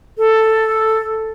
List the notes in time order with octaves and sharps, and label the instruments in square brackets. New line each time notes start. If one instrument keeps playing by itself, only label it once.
[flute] A4